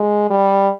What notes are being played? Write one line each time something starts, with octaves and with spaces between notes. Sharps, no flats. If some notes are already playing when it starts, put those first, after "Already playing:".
Already playing: G#3
G3